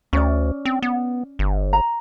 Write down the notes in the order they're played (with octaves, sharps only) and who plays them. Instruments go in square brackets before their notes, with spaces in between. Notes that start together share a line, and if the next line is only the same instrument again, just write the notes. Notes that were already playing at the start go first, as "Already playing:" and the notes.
[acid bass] D2 [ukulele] C#4 D5
[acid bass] C4
B3
G1
[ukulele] A#5